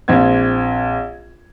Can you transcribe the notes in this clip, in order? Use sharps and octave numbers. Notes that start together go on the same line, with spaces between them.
A#1 C4 G#6